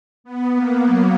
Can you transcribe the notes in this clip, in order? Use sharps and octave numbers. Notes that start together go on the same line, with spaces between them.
B3
A#3
F#3